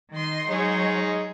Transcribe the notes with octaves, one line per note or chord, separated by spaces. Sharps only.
D#3 D#5 C6
F#3 G#3 D#4 G#4 C#5